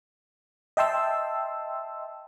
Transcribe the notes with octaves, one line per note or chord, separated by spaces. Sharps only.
D#5 E5 G5 A5 C6 E6